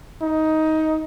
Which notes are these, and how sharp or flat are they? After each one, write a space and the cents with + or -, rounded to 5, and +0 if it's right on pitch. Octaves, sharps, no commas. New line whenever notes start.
D#4 +15